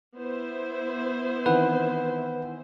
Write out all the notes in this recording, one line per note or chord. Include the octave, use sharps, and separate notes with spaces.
B3 E4 C5
D#3 E3 C4 B4 F#5